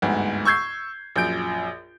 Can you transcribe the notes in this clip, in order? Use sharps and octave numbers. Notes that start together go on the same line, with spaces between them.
G1 D2 G#2
C#6 E6 G6 G#6 C7
A#1 F#2 G6 D7